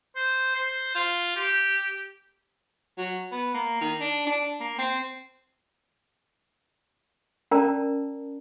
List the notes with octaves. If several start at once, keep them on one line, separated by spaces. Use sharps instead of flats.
C5
C5
F4
G4
F#3
B3
A#3
D#3
D4
D4
A#3
C4
C#4 A#4 D5 A5 A#5